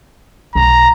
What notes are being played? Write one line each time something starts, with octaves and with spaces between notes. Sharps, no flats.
B1 A#5